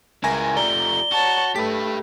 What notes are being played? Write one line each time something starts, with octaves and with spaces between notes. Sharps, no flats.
C#2 E4 A#4 G#5 A#6
F3 A3 D5 A#5 G7
F#4 C#5 A5
A3 G4 B4 B6